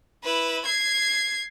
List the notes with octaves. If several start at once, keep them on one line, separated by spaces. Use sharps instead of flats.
E4 B4
G#6 C7